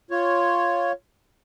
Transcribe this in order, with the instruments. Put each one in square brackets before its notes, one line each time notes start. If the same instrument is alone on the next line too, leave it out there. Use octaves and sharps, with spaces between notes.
[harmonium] F4 C#5